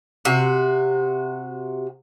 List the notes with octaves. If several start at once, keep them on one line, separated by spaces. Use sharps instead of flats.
C3 F#4